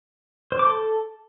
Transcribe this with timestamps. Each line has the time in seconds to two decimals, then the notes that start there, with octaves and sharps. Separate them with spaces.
0.52 C5
0.59 D6
0.67 A4